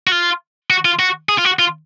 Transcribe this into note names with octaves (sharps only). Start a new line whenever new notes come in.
F#4
F4
F#4
F4
F#4
G#4
F4
F#4
F4